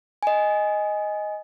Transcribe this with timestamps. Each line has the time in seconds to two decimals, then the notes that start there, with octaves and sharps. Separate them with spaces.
0.23 D#5 G#5